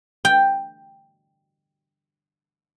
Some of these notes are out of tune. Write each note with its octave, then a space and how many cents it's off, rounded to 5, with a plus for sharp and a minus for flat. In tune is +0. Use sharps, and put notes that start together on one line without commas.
G5 +5